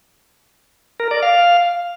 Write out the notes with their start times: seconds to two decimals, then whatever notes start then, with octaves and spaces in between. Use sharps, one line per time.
1.00 A#4
1.11 D5
1.23 F5